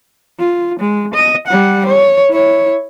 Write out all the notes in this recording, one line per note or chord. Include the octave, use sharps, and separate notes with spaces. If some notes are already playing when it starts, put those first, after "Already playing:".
F4
G#3
D#5
G3 F#5
C#5
E4 C#5